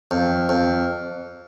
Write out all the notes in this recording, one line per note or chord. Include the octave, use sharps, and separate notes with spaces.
F2
F2